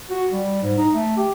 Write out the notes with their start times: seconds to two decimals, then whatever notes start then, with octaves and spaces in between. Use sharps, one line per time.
0.10 F#4
0.32 G3
0.63 G#2
0.78 D#4
0.94 A3
1.17 G4